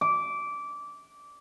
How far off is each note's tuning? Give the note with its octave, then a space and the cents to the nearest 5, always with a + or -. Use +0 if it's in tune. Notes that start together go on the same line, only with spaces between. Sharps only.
D6 -15